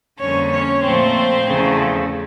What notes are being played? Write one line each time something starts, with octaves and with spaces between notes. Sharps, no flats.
F2 D3 G3 A#3 C#4 C#5
C#4 C#5
A#2 F3 A3 C4 C5
E2 C#3 F3 A3